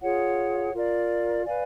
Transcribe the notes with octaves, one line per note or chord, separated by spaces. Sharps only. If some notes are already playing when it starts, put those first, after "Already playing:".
F4 G#4 C#5 F#5
F4 A#4 D5
B4 D5 F5 G#5